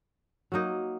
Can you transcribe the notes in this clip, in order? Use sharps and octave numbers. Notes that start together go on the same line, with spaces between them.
F#3 A#3 D#4